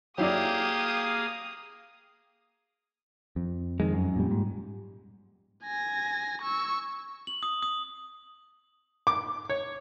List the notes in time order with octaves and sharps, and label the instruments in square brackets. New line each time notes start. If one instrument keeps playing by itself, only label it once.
[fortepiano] F#3 E4 D5 [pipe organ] A#3 G#4 F5 [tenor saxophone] G4 [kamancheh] D#6
[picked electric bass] F2
[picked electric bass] F2 [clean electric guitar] D#3 G#3
[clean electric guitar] F#2
[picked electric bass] A#2 G3
[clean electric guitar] G#2
[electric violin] G#5 A#6
C#6 E6
[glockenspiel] F#7
D#6
D#6
[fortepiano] D6
C#5